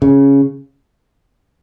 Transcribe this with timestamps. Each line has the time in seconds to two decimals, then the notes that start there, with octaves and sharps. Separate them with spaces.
0.02 C#3